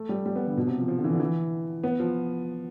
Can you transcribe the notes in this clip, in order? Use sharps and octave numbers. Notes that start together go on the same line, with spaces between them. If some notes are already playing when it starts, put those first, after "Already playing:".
Already playing: A3
G3
G3
B3
D3
B2
C3
F3
F3
D3
E3
D3
E3
B3
F3